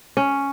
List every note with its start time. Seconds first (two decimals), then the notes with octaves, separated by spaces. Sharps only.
0.17 C#4